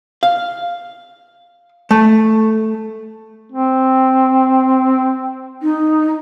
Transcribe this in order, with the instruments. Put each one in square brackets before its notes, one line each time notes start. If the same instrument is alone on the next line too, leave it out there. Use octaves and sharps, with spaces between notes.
[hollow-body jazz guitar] F5
A3
[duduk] C4
[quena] D#4